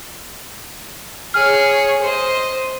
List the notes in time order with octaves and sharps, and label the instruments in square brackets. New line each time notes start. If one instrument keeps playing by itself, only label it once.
[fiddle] G#4 C#5 [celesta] F6
[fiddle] C5 D#5